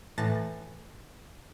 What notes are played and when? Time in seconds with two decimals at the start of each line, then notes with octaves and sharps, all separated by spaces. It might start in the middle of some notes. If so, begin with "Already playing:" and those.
0.18 A2 E3 A5 A6 A#6 E7